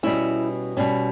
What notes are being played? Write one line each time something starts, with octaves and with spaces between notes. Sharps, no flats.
B2 G3 C#4 E4
B2 G3 C#4